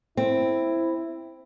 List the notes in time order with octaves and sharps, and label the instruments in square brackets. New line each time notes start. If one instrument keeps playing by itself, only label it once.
[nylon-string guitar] C4 [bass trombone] E4